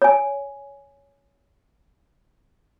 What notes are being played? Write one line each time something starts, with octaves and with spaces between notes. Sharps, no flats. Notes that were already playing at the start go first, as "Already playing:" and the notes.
C#5 G#5